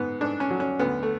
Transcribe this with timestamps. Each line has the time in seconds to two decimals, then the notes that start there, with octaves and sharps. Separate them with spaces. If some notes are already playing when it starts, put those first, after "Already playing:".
Already playing: G#2 B3
0.21 G#2 D4
0.40 C#4
0.51 F#3
0.60 C#4
0.79 D2 B3
1.03 A3